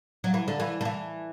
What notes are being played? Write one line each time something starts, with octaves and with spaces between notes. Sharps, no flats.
F#3
E3
D3
E3
D3
E3